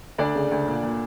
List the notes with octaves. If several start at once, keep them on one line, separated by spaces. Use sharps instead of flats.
D2 D4 D5
C#3
D2
A#2
A#2